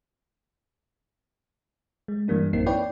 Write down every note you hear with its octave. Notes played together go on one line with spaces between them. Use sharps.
G#3
G2 E3 G3 A#3 D4
A1 F#2 A#3 C4 D#4 C7
E4 B4 C#5 D5 G5